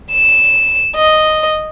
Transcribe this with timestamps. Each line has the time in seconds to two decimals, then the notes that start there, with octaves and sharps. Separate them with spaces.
0.12 E7
0.96 D#5